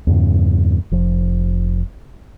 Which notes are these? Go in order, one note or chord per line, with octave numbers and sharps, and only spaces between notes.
E2 G2 C#3
F1 F3